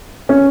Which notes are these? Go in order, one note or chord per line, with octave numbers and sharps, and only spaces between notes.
C#4